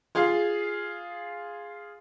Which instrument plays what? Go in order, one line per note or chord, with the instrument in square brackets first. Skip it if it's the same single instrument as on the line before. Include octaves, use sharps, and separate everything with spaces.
[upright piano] F4 G#4 F5